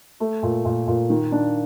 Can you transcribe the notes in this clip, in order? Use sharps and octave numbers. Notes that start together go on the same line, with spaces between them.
A3
A#2
A#2
A#2
D#3
D4